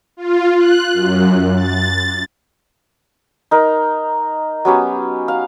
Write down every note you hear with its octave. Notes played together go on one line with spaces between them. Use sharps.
F4
F#6
F#2
A6
D#4 A#4
F#3 B3 C#4 G4
F5